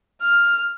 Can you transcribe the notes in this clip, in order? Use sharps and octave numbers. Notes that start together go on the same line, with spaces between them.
F6